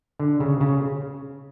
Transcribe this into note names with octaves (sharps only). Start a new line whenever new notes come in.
D3
C#3
C#3